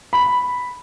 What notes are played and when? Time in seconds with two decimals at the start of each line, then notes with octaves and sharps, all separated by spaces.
0.13 B5